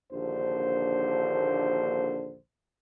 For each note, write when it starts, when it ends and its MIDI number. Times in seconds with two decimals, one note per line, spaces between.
0.13 2.37 34
0.13 2.37 39
0.13 2.37 50
0.13 2.37 72